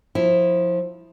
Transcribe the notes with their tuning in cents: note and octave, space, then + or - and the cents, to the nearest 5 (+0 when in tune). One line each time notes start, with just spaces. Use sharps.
F3 +15 E4 +0